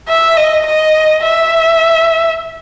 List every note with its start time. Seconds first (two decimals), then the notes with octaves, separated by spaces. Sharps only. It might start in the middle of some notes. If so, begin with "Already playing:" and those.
0.08 E5
0.37 D#5
0.66 D#5
1.23 E5